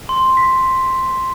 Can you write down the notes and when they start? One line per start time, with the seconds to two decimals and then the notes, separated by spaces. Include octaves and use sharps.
0.09 C6
0.37 B6